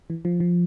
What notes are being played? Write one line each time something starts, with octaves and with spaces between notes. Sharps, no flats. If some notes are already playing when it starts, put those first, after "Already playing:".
E3
F3
F3